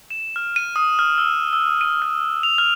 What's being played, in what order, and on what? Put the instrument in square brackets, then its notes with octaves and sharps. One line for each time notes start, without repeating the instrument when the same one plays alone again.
[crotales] E7
F6
D#7
D#6
F6
E6
E6
D#7
F6
F7
F6